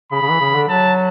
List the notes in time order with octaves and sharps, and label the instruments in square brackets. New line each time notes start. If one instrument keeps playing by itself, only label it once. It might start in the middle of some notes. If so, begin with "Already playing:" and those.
[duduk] C#3 [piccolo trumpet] B5
[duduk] C#3
E3
C#3
D3
[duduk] F#3 [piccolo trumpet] A5